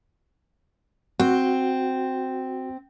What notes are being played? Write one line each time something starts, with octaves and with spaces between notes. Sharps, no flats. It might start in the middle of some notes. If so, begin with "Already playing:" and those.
C4 F#4